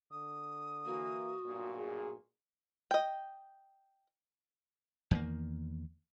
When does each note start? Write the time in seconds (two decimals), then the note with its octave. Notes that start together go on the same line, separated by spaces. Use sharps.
0.11 D3 D#6
0.86 E3 A#3 F#4
1.46 B1 G2 A#2
1.76 G#4
2.91 D#5 G5
5.11 E2 D#3 A#3